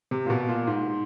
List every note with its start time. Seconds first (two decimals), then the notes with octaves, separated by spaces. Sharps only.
0.11 C3
0.26 A#2
0.30 B2
0.48 A#2
0.67 G#2